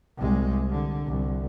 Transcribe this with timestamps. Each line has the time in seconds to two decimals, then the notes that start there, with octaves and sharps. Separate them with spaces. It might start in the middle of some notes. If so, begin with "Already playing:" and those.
0.18 C2 G#3
0.70 D3
1.06 C2